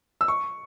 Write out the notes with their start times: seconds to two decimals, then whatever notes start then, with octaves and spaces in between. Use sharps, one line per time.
0.21 E6
0.28 C#6